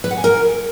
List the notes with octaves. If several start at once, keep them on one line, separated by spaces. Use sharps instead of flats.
B4
F#5
G#5
A#4